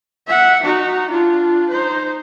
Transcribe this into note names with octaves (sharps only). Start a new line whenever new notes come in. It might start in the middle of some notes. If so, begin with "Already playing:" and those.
E5 F#5
D#4 F#4
D4 F4
D#4 C5